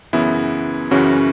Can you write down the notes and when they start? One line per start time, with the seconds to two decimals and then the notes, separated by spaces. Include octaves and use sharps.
0.13 F#2 C#3 E3 B3 E4
0.91 F#2 C#3 E3 C#4 F#4